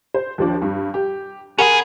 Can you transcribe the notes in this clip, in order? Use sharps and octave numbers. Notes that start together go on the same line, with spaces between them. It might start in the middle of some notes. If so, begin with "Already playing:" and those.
C5
D#2 F3 D4
G2
G4
C#4 G#4 A#4 F#5 B5